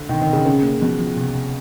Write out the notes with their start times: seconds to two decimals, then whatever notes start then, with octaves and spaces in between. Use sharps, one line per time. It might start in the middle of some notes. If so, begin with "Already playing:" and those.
Already playing: D3
0.09 B2 D#3
0.21 D#3
0.27 B2
0.33 C#3
0.45 C#3 C#4
0.63 A#3
0.81 B2 F3
0.99 F3
1.18 C3
1.35 C3